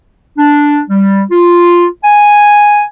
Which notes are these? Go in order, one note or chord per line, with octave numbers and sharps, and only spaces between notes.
D4
G3
F4
G#5